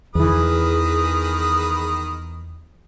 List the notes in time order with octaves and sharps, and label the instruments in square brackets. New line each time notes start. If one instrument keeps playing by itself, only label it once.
[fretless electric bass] E2 E3 [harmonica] D#3 B4 D#6 [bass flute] G#4